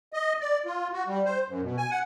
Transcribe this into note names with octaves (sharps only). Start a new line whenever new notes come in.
D#5
D5
F4
F#4
G3
C5
F#2
B2
G#5
F#5